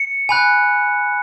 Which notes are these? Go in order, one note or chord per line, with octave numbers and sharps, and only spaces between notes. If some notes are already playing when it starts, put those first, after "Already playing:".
Already playing: C#7
G#5 B5 F#6